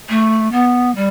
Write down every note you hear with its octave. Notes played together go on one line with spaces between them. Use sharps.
A3
B3
G3